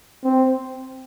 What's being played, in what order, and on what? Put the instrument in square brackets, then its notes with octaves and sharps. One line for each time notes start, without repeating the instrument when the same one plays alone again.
[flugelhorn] C4